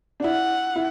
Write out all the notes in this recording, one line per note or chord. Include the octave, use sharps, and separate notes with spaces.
D4
E4 F#5
E4